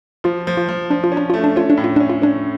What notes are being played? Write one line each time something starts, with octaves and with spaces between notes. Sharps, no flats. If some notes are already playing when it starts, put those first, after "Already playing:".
F3 F4
F3
F4
F3
F3 D4
F4
C#4
D4
A3 F4
D4
C#4 F4
D4
A2
F4
C#4 D4
F4
C#4 D4